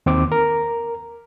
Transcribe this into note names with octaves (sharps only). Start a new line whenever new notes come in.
D#2 C4 D6
A#4